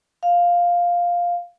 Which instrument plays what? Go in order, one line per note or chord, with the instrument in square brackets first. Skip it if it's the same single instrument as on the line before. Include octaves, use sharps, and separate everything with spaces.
[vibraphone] F5